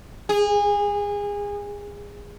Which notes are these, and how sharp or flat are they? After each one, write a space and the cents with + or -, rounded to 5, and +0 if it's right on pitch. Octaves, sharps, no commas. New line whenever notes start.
G#4 -25